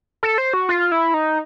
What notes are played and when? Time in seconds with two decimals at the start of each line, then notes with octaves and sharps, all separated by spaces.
0.23 A4
0.38 C5
0.53 F#4
0.69 F4
0.92 E4
1.14 D#4